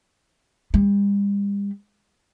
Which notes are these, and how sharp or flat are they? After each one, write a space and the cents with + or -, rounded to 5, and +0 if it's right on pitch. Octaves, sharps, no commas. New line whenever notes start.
G3 +40